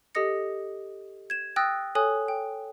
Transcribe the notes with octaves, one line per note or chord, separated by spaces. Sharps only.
G4 A4 D#5 D#6 A#6 C#7
G#6 E7
G5 D#6 E6 F#6 A6 A#6
A4 C#5 G#5 D#6 F#6
G5